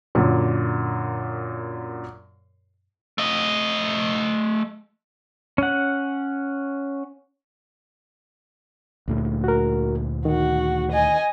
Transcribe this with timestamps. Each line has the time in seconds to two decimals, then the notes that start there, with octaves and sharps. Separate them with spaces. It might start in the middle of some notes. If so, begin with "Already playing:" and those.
0.15 F#2 A#2 D3
3.18 A3 D#5
5.58 C#4 F#5
9.08 D2 A#2 A3
9.44 F#4 A#4
10.25 D#3 F#4
10.92 D#5 G#5